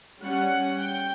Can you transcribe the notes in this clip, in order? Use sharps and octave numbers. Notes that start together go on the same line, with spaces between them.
G3 C#4 F#5
G5